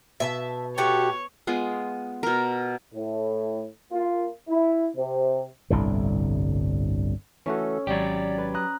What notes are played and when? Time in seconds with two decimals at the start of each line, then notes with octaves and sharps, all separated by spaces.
0.20 B2 E5 G#5 A5
0.78 A3 F#4 G4 C#5
1.47 G#3 B3 F4
2.23 B2 A#4
2.95 A2
3.92 A#3 F4
4.49 E4
4.97 C3
5.70 G1 C2 A2 D3
7.46 E3 A3 C#4 F#4 A4
7.87 G#1 F#3 G4 D5
8.38 B4
8.54 A#5 D#6 F#6